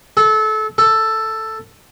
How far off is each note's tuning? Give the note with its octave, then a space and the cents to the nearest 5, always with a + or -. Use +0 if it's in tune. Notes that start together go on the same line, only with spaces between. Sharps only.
A4 -25
A4 +5